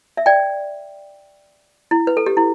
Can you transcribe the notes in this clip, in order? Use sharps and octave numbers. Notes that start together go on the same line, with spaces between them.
E5
D5 G5
E4
B4
A4
G4
E4